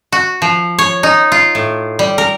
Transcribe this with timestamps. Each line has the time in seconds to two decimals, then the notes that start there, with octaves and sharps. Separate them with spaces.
0.12 F#4
0.42 F3
0.79 C#5
1.03 D#4
1.32 F4
1.55 A2
1.99 G3
2.18 A#4